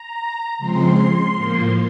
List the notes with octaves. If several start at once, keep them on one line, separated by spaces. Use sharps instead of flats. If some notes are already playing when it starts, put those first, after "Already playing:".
Already playing: A#5
C#3 F3 G#3 C4 C6
A2 F3 A#3